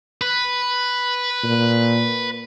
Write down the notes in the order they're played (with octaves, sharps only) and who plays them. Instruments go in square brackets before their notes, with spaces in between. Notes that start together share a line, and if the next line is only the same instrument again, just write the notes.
[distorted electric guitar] B4
[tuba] A#2